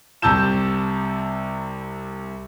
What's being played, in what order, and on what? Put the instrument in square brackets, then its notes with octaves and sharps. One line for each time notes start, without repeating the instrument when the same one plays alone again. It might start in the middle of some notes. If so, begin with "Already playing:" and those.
[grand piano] C2 C3 A5 E6 G6 E7